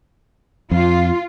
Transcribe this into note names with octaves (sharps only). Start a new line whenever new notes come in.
F2 F4